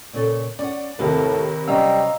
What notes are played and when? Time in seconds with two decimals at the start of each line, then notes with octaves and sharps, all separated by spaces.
0.13 A#2 C#3 A4
0.59 C#4 D5 F#5
0.99 D#2 A2 C3 A#4 B4 F5
1.68 C3 F#3 G3 C#4 D#5 F5 A#5 E6